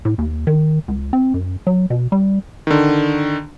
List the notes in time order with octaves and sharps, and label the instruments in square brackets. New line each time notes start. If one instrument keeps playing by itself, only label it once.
[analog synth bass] A2
D#2
D#3
C#2
C4
F#2
F#3
B2
G3
[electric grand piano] D3 D#3